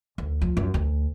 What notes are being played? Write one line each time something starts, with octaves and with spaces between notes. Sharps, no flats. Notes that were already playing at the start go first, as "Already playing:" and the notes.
D2
F3
F#2
D2